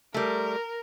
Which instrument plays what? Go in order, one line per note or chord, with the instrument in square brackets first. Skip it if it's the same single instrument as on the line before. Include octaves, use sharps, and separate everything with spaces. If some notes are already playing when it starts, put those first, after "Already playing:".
[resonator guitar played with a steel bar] G3 A3 [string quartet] A#4